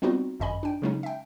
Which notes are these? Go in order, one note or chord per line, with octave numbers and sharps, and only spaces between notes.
G3 B3 C4 D#4 F4 F#4
G#1 F#2 D#5 G#5 B5
D4 G5
C#3 F#3 G#3 A#3 C#4 D#4
E5 G5